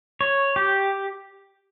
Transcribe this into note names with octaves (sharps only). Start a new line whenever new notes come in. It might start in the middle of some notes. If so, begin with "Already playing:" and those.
C#5
G4